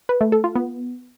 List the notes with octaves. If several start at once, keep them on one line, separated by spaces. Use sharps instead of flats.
B4
A3
A4
F4
B3